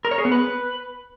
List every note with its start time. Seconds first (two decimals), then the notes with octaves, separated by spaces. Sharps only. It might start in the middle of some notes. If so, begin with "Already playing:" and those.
0.05 A#4
0.11 C#5
0.18 G#4
0.25 B3
0.32 B4